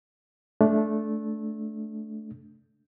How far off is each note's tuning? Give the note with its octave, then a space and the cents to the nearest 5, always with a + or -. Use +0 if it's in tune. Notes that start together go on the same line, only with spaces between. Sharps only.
A3 -15 D4 -10